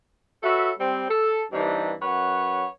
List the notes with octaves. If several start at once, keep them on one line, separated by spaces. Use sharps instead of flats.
F#4 A4 B4 C#5 E5
G3 C4
A4
G2 C3 E3 D4 D#4
F#2 B4 C#5 F#5